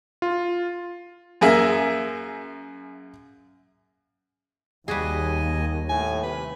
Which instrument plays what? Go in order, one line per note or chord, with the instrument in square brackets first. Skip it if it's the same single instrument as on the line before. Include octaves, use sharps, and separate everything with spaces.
[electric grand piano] F4
[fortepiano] F#2 A#3 G#4 E5
[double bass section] D#2 [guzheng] G3 F#4 G#4 [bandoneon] D#5 G#5
[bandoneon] A2 A3 [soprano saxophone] G#5
[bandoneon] C3 [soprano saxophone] B4